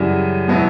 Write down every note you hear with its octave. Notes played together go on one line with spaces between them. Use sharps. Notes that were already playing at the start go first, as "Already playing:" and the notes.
Already playing: F#2 C#3 E3 G3
B2 F#3 B3 E4